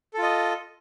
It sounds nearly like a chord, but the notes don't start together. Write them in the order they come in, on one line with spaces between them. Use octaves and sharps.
A4 F4 D#5